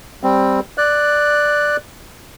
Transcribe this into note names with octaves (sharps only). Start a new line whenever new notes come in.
G3 C4
D5 F#6